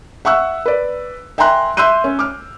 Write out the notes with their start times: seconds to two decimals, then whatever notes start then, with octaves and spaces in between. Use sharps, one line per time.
0.25 E5 F#5 C#6 E6 F#6
0.66 B4 D5
1.38 E5 G5 G#5 A#5 C6 F#6
1.77 E5 C6 E6 F#6 G6 D#7
2.04 C#4
2.19 D6 F6